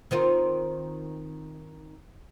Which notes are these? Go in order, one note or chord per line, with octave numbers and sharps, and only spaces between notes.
D#3 C4 F4